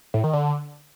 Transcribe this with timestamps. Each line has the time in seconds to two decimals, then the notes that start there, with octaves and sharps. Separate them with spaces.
0.14 A2
0.24 D#3
0.33 D3